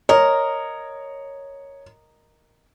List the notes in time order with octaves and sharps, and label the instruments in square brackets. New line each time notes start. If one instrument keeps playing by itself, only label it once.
[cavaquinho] A#4 D#5 [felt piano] C#5